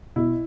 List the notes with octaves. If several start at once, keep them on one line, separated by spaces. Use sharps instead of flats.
B2 E4